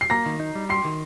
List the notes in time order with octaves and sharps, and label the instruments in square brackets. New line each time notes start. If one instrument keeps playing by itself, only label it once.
[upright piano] C7
[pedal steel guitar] A#3 [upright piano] A#5 A#6
[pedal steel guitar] D#3
D#4
G3
[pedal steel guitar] G4 [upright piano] C6 C7
[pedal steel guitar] D#3